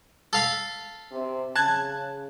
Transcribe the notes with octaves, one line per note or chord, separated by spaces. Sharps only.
A4 F5 B5
C3
C#3 A5 F#6 G#6